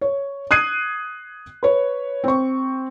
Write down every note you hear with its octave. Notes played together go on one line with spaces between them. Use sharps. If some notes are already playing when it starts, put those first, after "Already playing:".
C#5
D#6 F#6 G#6 C7 D#7
B4 C#5
C4 C#6